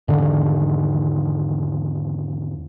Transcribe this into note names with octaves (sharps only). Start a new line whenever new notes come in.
E2 G#2 D3 D#3